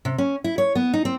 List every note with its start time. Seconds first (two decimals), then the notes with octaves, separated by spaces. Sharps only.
0.05 C3
0.18 C#4
0.44 E4
0.58 C#5
0.75 B3
0.94 D#4
1.05 C4